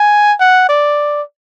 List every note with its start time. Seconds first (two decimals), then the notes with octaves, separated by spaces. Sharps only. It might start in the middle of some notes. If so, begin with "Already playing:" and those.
Already playing: G#5
0.40 F#5
0.69 D5